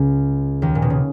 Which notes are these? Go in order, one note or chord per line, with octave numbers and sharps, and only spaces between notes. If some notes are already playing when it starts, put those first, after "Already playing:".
Already playing: C#2 C#3
D#2 D#3
A#2
B2
C#3